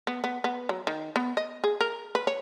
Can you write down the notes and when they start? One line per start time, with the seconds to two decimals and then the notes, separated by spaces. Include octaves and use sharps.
0.07 B3
0.24 B3
0.44 B3
0.69 F#3
0.87 D#3
1.16 B3
1.37 D#5
1.64 G#4
1.81 A#4
2.15 B4
2.27 C#5